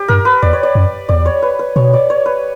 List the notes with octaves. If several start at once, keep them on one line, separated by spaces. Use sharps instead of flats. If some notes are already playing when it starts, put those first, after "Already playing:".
Already playing: G4
G2 A#4
B4
E2 D5
C#5
D5
F#2
E2 D5
C#5
B4
B4
B2 C#5
D5
C#5
B4